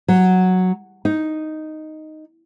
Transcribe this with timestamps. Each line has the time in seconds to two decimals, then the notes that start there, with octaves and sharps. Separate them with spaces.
0.08 F#3
1.05 D#4